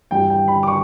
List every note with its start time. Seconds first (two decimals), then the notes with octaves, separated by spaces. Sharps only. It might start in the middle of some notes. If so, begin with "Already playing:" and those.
0.11 G2 E3 G3 G5
0.30 G5
0.48 B5
0.63 D6
0.67 C#6